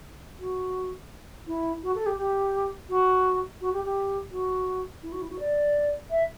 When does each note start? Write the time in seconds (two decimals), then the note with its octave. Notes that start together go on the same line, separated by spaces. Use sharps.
0.39 F#4
1.46 E4
1.83 F#4
1.95 A4
2.06 G4
2.18 G4
2.89 F#4
3.61 F#4
3.73 G4
3.84 G4
4.31 F#4
5.02 E4
5.12 F#4
5.21 E4
5.30 F#4
5.39 D5
6.10 E5